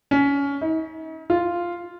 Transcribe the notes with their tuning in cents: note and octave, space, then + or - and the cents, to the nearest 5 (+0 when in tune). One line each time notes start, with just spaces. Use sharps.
C#4 +20
D#4 +45
F4 -5